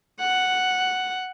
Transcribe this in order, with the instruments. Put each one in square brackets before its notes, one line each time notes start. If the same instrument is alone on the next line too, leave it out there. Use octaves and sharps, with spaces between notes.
[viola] F#5